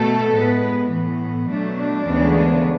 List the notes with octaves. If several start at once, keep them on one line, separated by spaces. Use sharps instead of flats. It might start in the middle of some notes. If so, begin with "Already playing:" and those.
Already playing: B2 A3 A4
A2 G#3 B3 B4
A2 E3 B3
B2 F#3 A3 D4
D4
D2 C#3 E3 G#3 B3